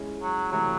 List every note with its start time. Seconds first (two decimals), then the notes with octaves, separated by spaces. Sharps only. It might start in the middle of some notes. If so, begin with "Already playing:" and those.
Already playing: G#3 C#4 E4
0.22 F#3
0.51 C3 E3 F#3 A3